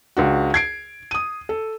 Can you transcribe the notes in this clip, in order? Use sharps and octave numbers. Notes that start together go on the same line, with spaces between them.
C#2 D4 F#4
G#6 C7 D7
D#6 D#7
A4